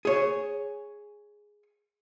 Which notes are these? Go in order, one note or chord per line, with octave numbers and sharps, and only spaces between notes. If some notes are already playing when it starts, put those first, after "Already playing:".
G#4 C#5